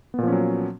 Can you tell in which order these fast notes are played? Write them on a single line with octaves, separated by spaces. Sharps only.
B3 A#2 F3 C#4 F#3